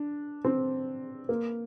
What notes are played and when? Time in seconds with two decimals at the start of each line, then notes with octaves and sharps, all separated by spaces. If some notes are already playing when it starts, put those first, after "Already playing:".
Already playing: D4
0.45 C4
1.29 A#3